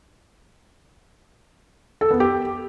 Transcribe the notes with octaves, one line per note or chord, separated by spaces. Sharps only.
A4
B3
G4